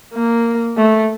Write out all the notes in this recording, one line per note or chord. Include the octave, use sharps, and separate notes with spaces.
A#3
A3